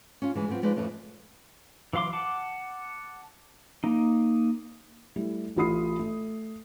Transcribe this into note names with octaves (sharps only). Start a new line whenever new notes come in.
C#4 F4
D2 E3 G#3 G#5
A2 F#3 B3 C4 F4
F3 G#3 D#4 B4 D5
F2 A2 E3 A3 C#4
E3 F#3 F5 C6 D6
F#5 A5 D6
A#3 D#4
G3 A3 E4
A1 A3 F4 B5 D#6 C7
A3